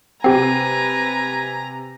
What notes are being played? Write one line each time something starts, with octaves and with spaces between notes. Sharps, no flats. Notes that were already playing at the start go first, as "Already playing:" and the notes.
C3 C4 G4 B4 G#5 A#5 C7